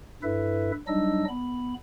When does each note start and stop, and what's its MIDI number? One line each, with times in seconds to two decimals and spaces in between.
0.23 0.72 43
0.23 0.72 64
0.23 0.72 69
0.23 0.72 71
0.23 0.72 76
0.88 1.25 54
0.88 1.25 55
0.88 1.25 62
0.88 1.25 63
0.88 1.25 75
0.88 1.25 88
1.29 1.74 59
1.29 1.74 83